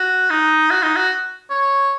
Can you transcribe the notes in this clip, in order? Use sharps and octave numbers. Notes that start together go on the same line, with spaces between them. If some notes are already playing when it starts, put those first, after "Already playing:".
Already playing: F#4
D#4
F#4
D#4
F#4
C#5